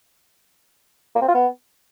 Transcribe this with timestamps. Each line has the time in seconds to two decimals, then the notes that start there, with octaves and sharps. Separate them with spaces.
1.15 A#3
1.22 C4
1.28 F4
1.34 B3